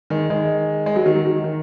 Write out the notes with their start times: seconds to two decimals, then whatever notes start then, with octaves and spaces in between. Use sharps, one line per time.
0.10 D#3 G#3
0.30 D#3 G#3
0.86 G#3
0.96 F#3
1.06 D#3
1.16 F#3
1.25 D#3
1.44 D#3